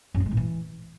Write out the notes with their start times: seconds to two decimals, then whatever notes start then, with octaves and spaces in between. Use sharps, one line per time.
0.14 F#2
0.20 F3
0.26 G#3
0.31 A2
0.37 E3